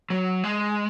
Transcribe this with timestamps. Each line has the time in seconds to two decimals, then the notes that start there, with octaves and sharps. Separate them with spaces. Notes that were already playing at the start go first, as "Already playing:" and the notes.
0.10 F#3
0.44 G#3